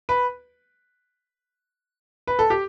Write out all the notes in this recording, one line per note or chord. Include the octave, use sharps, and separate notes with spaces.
B4
B4
A4
G4